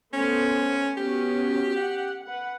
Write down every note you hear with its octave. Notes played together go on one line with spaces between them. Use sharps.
A3 B3 C#4 C5
B3 C#4 F#4 G4
F#5
B4 F#5